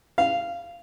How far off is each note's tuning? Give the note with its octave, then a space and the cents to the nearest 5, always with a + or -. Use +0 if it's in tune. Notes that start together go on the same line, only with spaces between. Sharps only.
F5 -15